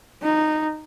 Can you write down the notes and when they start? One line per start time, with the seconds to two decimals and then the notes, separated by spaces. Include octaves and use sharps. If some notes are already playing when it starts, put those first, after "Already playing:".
0.22 D#4